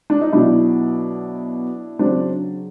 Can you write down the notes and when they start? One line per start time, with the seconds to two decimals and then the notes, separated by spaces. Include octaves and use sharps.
0.10 D4
0.21 D#4
0.32 B2 F#3 D4 E4
1.99 C#3 F#3 C4 D4